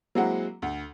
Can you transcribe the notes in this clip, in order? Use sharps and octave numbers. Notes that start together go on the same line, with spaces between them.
F#3 G#3 A#3 C4 E4 F#5
D2